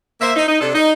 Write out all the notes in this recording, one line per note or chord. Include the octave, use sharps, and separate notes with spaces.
A#3 C5 E5
D#4
D#4
C3 D4 A4
D#4